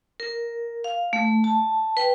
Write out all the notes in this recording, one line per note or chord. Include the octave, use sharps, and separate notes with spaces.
A#4
F5
A3
A5
B4 G5